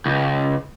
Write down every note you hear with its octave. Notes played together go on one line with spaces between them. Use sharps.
C#2